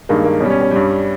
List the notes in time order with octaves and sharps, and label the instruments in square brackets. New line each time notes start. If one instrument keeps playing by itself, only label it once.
[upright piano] G2 D#3 G#3 A#3
A#3
B2 C#4
G3
C#4
C#4
G2 G3